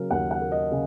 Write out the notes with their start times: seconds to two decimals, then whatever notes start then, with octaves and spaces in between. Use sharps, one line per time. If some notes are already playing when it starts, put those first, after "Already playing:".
Already playing: C#3 F#3 A#3 A#4
0.11 D#2 F#5
0.31 F#5
0.41 A#3
0.52 D#5
0.71 C#3